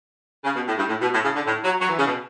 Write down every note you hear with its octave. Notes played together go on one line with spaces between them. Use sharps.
C#3
B2
A2
G2
A2
B2
A2
C#3
D3
A2
F#3
F#3
E3
C#3
B2